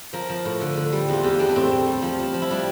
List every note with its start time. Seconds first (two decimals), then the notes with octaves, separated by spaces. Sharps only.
0.13 F3 A#4
0.29 F3
0.45 A2
0.61 D3
0.77 D3
0.92 G3
1.08 E2 F4
1.23 E2 G4
1.39 E2 D4
1.49 D4
1.56 A2 C4
1.71 A2
1.87 G3
2.02 F3
2.19 F3
2.34 F3
2.42 E4
2.50 G3 D4